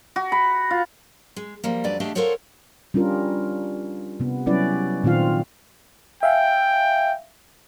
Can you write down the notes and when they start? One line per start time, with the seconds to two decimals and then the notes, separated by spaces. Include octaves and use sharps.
0.16 F#4
0.32 B5
0.71 F4
1.36 G#3
1.64 F3 G3 A#3
1.84 F2 F#3 G3 D4 B4 D5
2.00 E2 A3 D4 G4 D#5 F5
2.15 F4 A4 A#4 C5 C#5 F#5
2.94 G3 C#4 D4 F4 A#4
4.20 C3 B3
4.46 F#3 G3 C#4 E4 B4 D5
5.04 A#2 D#3 C4 F4 F5
6.23 E5 F5 G5 G#5